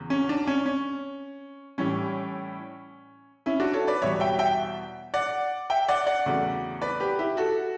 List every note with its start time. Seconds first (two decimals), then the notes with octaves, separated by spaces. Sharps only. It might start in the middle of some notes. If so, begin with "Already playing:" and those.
Already playing: E2 C#3 F#3
0.10 C#4
0.29 D4
0.47 C#4
0.66 C#4
1.78 A2 E3 G3 C#4
3.46 C#4 E4
3.60 D4 F#4
3.73 A4 C#5
3.87 B4 D5
4.02 E2 B2 G3 C#5 E5
4.20 E5 G5
4.39 E5 G5
5.14 D5 F#5
5.70 E5 G5
5.88 D5 F#5
6.06 D5 F#5
6.26 E2 C#3 F#3 A3
6.82 B4 D5
7.00 G4 B4
7.19 E4 G4
7.37 F#4 A4